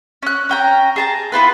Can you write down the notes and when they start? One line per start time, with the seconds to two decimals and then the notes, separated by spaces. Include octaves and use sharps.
0.23 C#4 F#6
0.49 C#4 G5 A#5
0.96 G#4 A5 A#5
1.32 B3 E4 F4 B4